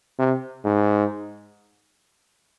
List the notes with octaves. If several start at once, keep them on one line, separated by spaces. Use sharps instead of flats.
C3
G#2